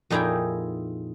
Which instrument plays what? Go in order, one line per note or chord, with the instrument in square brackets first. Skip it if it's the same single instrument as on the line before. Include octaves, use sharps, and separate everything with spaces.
[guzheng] F2 A#2 D#4 E4 G#4 G5